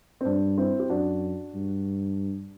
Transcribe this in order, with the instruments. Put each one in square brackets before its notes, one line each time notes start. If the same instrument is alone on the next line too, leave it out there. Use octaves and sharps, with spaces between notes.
[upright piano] C4
[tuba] G2 [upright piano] D4
[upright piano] C4 E4
G4
[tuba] F#2 [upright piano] D4 F#4
[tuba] G2